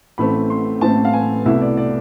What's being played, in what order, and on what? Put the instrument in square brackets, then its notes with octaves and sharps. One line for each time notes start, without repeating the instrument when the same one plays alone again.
[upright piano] A1 A2 E3 A3 C4 B5
C6
A1 A2 E3 A3 C4 A5
F5
G#5
C2 B2 A3 E4 E5
D5
D5